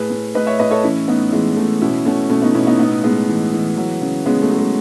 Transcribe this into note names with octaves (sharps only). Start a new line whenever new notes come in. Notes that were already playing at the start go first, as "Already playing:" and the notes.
Already playing: A2 G#4 B4
A2
A2 B4 D#5
C#5 E5
A2 B4 D#5
A4 C#5
E3 C#4 E4
A2 B3 D#4
E3 G#3 B3
E3 A3
B2 C#4 E4
B2 A3 C#4
B2 A3 C#4
B3 D#4
B2 C#4 E4
B3 D#4
A2 B3 D#4
A2 G#3 B3
E3
E3
F#3
C#3
C#3 G#3 B3
A3
F#3
G#3